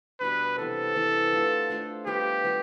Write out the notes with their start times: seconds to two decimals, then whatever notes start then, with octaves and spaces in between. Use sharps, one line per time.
0.20 B2 G3 D4 B4
0.58 C3 E3 B3 A4
0.96 C3 E3 B3
1.33 A3 D4 F4 C5
1.70 A3 D4 F4 C5
2.06 G3 B3 F4 G4 B4
2.44 G3 B3 F4 B4